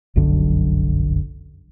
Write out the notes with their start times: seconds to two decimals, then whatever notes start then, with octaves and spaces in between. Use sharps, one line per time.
0.16 F1 B1 F#2 D3